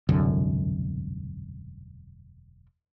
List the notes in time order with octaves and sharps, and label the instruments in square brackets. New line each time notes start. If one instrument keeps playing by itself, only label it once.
[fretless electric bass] E1 C2 F#2 D3